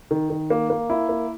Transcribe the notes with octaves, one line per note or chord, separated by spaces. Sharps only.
D#3
D#3
A#3
A#3
E4
A#3